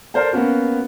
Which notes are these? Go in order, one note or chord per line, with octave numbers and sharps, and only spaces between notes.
A4 A#4 C5 D5 A5
A#3 B3 C#4 F#4